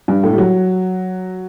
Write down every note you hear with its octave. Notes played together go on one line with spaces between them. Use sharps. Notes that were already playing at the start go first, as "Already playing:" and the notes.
G2
A2
G3
F#3